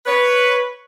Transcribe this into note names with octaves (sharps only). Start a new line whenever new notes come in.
B4 C#5